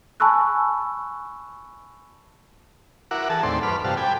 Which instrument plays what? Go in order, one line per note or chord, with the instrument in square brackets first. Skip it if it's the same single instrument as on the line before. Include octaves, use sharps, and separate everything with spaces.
[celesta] G#5 A5 B5 C#6 E6 F#6
[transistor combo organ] E4 F#4 A#4 F#5 D6
E3 G#4 A4 A5
D#2 A2 C4 A4 D5 C6
F#2 B4 B5 D6 F6
G2 C3 F3 F#4 A5 F6
A4 G5 G#5 B5 D6